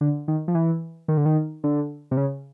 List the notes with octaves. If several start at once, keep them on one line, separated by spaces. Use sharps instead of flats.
D3
D#3
F3
E3
D#3
D3
D#3
D3
C3
C#3